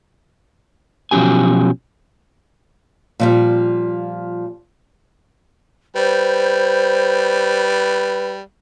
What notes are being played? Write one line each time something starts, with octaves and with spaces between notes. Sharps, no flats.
B2 F3 F#3 C#4 G4 G#5
A#2 F3 G3
G3 B4 C5